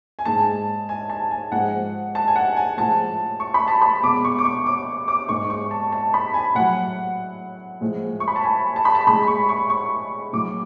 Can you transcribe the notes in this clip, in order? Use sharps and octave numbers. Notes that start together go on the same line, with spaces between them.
G#5
G#2 G#3 A5
G#5
A5
G#5
G#2 F3 G#3 F#5
A5
G#5
F#5
G#5
A2 F3 G#3 A5
C#6
B5
A5
B5
B2 G#3 D6
C#6
D6
C#6
D6
D6
G#2 G#3 C#6
C#6
A5
A5
B5
G#5
A2 F#3 F#5
A2 F3 G#3
C#6
B5
A5
G#5
A5
B5
A5
A2 G#3 B5
C#6
C#6
C#6
A2 F#3 D6